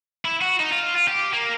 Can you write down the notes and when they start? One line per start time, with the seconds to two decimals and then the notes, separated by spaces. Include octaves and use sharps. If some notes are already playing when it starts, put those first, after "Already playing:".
0.25 E4
0.41 F#4
0.59 D#4
0.71 F4
0.95 F4
1.08 G4
1.33 A#3